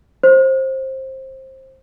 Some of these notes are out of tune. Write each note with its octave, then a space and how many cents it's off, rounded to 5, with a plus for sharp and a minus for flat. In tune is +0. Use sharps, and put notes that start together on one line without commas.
C5 +20